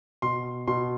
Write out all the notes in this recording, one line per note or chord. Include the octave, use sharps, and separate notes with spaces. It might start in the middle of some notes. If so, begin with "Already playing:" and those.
B2 C6
B2 C6